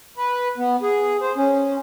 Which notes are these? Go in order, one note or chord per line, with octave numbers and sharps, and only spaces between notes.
B4
B3
G#4
C5
C#4